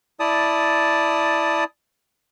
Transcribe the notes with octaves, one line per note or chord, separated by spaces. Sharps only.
E4 D5 A5 D#6